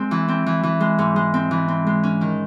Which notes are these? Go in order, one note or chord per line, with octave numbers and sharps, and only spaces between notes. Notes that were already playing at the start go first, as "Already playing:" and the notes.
Already playing: G#3 C4
E3
C4
E3
E3
G#3
G#2
G#3
C4
E3
C4
G#3
C#4
D#3